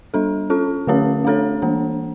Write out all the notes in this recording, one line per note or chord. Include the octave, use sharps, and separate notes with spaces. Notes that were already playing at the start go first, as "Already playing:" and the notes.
G3 D4 A4
C#4 F4 A4
D3 A3 C#4 G4 C#5
A3 D4 A4 C#5
E3 A#3 D4